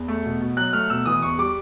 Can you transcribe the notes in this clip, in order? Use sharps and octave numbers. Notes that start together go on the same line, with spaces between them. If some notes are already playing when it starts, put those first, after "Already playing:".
Already playing: E2
A3
B2
B2
F#3 F#6
A3 F6
B2 E6
E3 D#6
E2 C#6
G3 D6